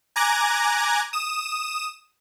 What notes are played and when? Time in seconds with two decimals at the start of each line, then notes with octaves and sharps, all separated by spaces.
0.16 G#5 A#5 D6 F#6 G#6 A#6
1.13 D#6 E7